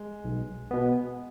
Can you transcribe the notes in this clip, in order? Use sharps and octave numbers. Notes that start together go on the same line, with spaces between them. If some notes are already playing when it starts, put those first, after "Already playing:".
Already playing: G#3
B1
B2 B3